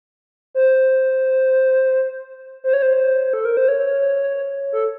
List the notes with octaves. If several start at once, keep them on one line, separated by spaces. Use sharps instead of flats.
C5
C5
C#5
C5
A4
A#4
C5
C#5
A4